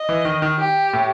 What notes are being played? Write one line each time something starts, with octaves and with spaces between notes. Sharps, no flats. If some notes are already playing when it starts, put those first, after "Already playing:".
Already playing: D#5
E3
D#3
D#3
G4
A2